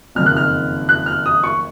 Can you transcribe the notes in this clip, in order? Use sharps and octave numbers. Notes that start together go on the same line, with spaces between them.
F#1 F2 D#3 F6
F#6
F6
F#6
F6
D#6
C#6